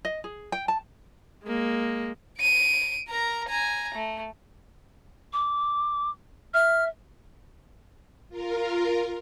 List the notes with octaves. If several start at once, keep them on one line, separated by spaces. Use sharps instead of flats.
D#5
G#4
G5
A5
G#3 A#3
D7 D#7
A#4 A#5
G#5 A#5
A3
D6
E5 F6
F4 A#4